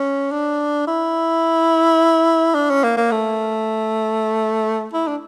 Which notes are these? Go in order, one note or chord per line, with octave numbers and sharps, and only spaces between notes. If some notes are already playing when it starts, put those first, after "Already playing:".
Already playing: C#4
D4
E4
D4
C#4
A#3
A#3
A3
E4
D4